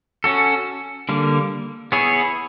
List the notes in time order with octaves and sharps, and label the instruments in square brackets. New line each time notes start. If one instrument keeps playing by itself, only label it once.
[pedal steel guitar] C#4 F#4 A4
D3 G3 A#3
B3 E4 G#4 C#5